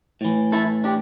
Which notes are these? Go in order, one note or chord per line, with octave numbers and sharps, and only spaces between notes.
A2 E3
E4 A4
D4 G4